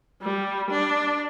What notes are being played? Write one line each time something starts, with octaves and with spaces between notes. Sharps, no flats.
G3
D4